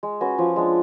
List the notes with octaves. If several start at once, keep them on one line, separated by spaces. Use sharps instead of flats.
G#3
C#4 F#4 B4
F3
G#3 D4